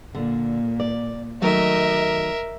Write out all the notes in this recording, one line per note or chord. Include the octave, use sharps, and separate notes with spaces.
A#2 D3
D5
D#3 F#3 A3 A#4 D#5 E5